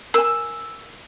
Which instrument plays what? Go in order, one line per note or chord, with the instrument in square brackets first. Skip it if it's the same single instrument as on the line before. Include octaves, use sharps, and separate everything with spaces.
[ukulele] A#4 G#5 [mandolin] E6